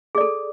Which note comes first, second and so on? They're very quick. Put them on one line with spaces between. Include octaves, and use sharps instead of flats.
G#4 D5 A4